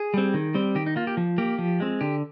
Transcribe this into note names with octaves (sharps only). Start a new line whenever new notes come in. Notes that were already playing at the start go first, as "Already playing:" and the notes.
Already playing: G#4
G3 C4
D#3
G3 C4
D#3 G4
D#4
A#3 F4
G4
F3
A#3 G4
F3
G#3 C4
D3 G4